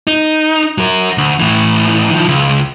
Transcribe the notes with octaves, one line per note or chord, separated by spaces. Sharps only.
D#4
F#3 A#4
D2
A2 E3
D#3 F3
C#2